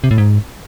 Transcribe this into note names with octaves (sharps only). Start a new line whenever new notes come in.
C3
A2
G#2